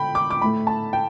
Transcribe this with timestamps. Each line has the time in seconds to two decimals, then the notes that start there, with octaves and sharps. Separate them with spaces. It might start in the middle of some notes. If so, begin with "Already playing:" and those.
Already playing: D3 G5 B5
0.15 D6
0.30 D6
0.41 A2 A3 B5
0.67 A5
0.93 G5